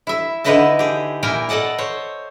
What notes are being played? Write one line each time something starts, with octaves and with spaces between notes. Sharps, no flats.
E4 E5
D3 D#4 E4 B4 D#5 A5
G4 G#4
A#2 A#3 E4 A#4 G5 G#5
A4 D5 D#5 F#5 A5
C5 C#5